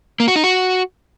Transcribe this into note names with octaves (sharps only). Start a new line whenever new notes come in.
A#3
F#4
D#4
F#4